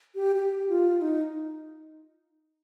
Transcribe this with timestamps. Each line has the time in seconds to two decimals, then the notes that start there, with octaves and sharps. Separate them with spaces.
0.15 G4
0.36 G4
0.69 F4
1.01 D#4